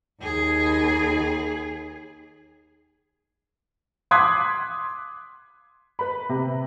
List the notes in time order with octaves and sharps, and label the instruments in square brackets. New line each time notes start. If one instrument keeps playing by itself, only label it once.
[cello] D#2 G#4
[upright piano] C6 D6 D#6 F#6 G#6 B6
[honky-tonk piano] B4 B5
C3